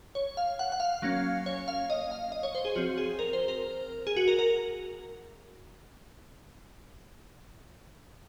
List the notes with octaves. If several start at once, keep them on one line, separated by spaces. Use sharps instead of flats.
C#5
F5
F#5
F#5
F5
F#3 A#3 C#4
C#5
F5
D#5
F5
D#5
C#5
C5
G#4
F3 C4 F#4
G#4
A#4
C5
A#4
G#4
F#4
A#4
A#4